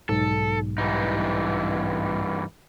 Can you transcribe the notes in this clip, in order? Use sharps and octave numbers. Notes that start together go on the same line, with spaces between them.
B1 G#2 A4
G2 E3 D#4